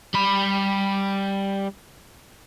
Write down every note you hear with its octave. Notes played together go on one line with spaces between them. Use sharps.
G3 B5